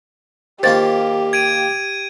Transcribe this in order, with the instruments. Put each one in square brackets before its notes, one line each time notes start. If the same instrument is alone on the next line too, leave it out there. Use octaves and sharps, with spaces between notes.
[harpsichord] D#3 A#3 F4 [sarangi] G4 [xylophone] C5 A6
[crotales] G#6 D7 D#7